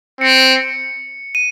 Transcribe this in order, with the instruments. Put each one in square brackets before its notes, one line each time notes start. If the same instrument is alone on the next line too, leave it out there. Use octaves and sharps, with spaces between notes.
[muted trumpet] C4 [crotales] C#7
[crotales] D#7